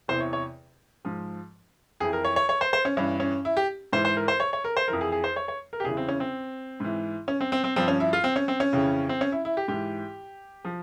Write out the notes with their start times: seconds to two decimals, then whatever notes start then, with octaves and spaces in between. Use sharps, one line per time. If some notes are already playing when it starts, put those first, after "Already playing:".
0.08 E2 C3 E3 C5
0.20 C#5
0.33 C#5
1.05 G#2 F3
2.00 F2 E3 G#4
2.13 A#4
2.25 C#5
2.36 C#5
2.49 C#5
2.61 C5
2.73 C5
2.85 C#4
2.97 G2 E3 C#4
3.20 C#4
3.45 E4
3.57 G4
3.93 G#2 E3 C5
4.05 C5
4.17 A#4
4.28 C5
4.40 C#5
4.53 C#5
4.64 A#4
4.77 C5
4.88 F2 E3 A#4
5.01 G#4
5.12 G#4
5.24 C5
5.36 C#5
5.48 C#5
5.73 A#4
5.80 G4
5.84 E2 C#3 E3 G#4
5.97 C4
6.08 C#4
6.20 C4
6.80 G#2 E3
7.28 C#4
7.41 C4
7.52 C4
7.64 C4
7.76 G2 F3 C4
7.88 C#4
8.00 E4
8.13 F4
8.24 C4
8.36 C#4
8.48 C4
8.60 C#4
8.73 F2 C#3 E3
9.09 C4
9.21 C#4
9.32 E4
9.45 E4
9.57 G4
9.68 G#2 E3 G4
10.65 F3